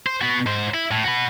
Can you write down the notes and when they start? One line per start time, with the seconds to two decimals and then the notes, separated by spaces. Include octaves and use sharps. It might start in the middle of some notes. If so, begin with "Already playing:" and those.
0.06 C5
0.21 B3 F#4
0.46 G#2 C5
0.74 E4
0.91 A2
1.04 F#4 B4